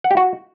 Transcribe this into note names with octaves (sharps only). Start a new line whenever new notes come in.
F#5
G4
F#4